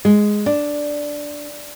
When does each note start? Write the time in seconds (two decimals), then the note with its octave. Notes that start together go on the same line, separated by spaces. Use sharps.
0.05 G#3
0.46 D4